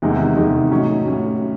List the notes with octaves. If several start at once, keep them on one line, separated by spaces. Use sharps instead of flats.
E2 C3 D#3 G#3 D#4
E2 C3 D#3 G#3 D#4
A2 F#3 C#4
A2 F#3 C#4